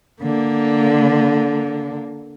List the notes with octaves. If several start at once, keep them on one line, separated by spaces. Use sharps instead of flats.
D3 A#3